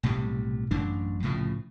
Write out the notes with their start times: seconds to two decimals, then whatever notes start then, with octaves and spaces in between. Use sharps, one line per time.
0.03 B1 A2 C3 G3
0.71 A1 F#2 F#3 D4
1.23 C2 A2 C#3 F3